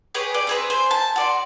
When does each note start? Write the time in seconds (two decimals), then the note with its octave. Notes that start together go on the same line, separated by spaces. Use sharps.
0.15 G4 G#4 B4 C#5
0.34 D5
0.47 C4 G#4 B4
0.70 C5 G#5
0.91 A5
1.16 F#4 D5 C6